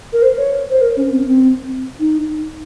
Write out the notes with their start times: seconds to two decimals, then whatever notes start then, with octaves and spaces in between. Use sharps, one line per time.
0.13 A#4
0.22 C5
0.37 C#5
0.70 C5
0.81 A#4
0.96 C#4
1.11 C4
1.26 C4
1.99 D#4